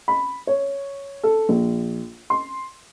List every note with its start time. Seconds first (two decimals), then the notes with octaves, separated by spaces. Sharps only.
0.08 B5
0.47 C#5
1.23 A4
1.49 A#1
2.30 C6